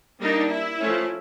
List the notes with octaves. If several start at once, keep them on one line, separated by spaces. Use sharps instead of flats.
G3 A#3 D4 D#4
E4
F3 A3 C#4